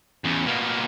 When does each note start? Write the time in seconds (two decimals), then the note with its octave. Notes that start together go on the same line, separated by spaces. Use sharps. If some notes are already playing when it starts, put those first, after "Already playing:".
0.24 E2 C#3
0.45 B2 A#3